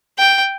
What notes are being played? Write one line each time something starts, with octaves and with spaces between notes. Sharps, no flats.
G5